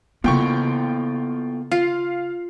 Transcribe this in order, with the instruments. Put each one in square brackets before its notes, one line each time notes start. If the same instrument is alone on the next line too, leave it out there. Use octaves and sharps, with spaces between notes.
[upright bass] C#3 A#3 [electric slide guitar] B3 E4 A4 [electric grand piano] F4 G5 C#6
[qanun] F4 [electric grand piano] F5 C7